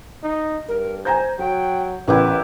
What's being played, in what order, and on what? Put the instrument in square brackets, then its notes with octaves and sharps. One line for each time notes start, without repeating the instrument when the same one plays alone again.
[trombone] D#4
[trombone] G2 [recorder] A#4
[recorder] C5 [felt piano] G#5 A#5 G6
[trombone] F#3 [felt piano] F#4 [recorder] G5
[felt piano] A1 [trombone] B3 [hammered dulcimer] E4 G4 A#4 [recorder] B4